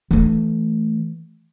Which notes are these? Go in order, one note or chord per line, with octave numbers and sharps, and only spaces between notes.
E3 A3